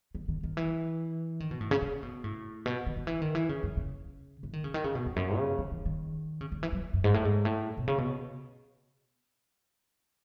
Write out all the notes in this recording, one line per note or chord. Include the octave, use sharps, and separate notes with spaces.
D#3
D#3
D#3
E3
D#3
B2
A2
C#3
C#3
B2
A2
B2
D#3
D#3
E3
D#3
E3
C#3
F#2
C#3
E3
D#3
C#3
D#3
C#3
B2
E2
F#2
C#3
D#3
E3
D#3
C#3
D#3
E3
F#3
F#2
G#2
A2
G#2
A2
B2
C#3
B2